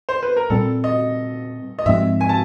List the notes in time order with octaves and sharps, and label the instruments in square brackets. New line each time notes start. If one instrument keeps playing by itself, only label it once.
[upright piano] C5
B4
A#4
[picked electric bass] A#2 G3 C4 [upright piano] A4
[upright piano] D#5
D#5
[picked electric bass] G#2 F3 G#3 C4 [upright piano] E5
[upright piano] G#5
A5